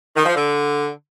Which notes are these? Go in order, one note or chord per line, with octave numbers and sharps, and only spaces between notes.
D#3
F3
D3